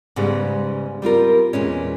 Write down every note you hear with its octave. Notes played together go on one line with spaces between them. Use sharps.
G#2 C#3 G3 G#3 B3
G3 C4 F4 A#4
E2 A#2 G#3 C#4